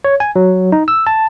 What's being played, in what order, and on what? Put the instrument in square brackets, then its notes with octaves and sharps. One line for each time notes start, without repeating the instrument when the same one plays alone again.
[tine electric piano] C#5
G#5
F#3
D#4
E6
A5